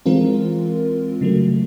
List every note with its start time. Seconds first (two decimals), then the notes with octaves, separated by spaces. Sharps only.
0.06 E3 G#3 C4 F4 A#4
1.21 C#3 F#3 A3